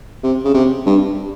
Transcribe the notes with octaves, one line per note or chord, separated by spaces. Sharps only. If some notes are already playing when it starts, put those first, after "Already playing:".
C3
C#3
C3
G2